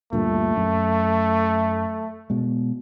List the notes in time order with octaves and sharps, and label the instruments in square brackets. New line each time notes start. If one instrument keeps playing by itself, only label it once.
[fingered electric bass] D2 G2 A#2 [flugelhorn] A3
[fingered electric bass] F#2
B2 G#3